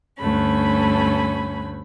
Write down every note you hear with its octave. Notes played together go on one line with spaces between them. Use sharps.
D2 G2 A3 C#4 B5